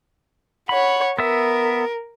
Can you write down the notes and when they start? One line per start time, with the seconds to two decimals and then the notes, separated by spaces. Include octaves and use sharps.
0.69 C#5 F#5 B5
1.19 B3 A#4 E5